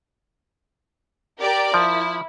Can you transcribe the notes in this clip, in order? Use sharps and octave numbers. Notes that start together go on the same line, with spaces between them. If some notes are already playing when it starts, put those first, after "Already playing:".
G4 A#4 D5
F3 E4